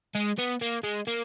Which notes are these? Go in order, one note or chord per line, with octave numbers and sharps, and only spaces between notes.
G#3
B3
A#3
G#3
A#3